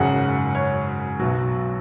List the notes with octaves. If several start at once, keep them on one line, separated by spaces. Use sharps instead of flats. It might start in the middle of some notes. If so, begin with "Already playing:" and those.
Already playing: G#1 F#2 C#3 F#5
C#5
B1 B2 F#3 F#4